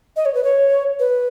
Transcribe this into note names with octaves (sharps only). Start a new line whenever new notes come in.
D#5
C#5
B4
C#5
B4